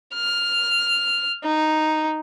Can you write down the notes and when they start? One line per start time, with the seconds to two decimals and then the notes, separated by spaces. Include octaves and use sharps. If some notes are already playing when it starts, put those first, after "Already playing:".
0.15 F6
1.44 D#4